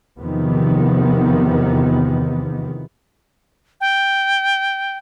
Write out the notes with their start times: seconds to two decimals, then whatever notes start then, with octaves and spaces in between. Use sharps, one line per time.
0.19 E2 C3 D#3 F3 B3
3.81 G5